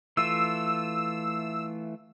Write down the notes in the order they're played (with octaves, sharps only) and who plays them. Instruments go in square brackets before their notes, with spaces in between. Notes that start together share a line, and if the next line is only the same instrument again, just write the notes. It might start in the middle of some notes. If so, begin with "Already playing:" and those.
[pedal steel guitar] E3 A3 F4 [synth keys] E6